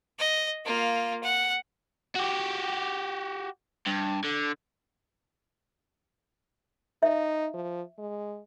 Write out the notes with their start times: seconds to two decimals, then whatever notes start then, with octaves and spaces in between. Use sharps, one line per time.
0.19 D#5
0.65 A#3 F4
1.23 F#5
2.15 F#4 G4
3.86 G2
4.24 D3
7.03 D#4 E5
7.54 F3
7.99 G#3